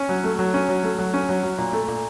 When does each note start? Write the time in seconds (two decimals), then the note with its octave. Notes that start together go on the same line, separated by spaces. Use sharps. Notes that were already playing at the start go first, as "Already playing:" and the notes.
Already playing: C#4
0.09 F#3
0.24 A3
0.39 F#3
0.54 C#4
0.69 F#3
0.84 A3
0.99 F#3
1.14 C#4
1.29 F#3
1.43 F#3
1.58 A#2
1.73 A3
1.88 A#2